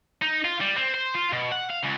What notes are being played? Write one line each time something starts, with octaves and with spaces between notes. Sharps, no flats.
D#4
F4
G3
C4
C5
F4
B2
F#5
F5
C#2